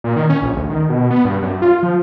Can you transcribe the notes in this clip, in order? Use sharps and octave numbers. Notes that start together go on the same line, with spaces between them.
A#2
D#3
C#4
A#1
D2
D#3
B2
B3
G2
F#2
F4
F3